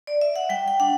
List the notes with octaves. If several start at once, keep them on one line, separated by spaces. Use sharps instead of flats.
D5
E5
F#5
G3 G5
G5
D4 F#5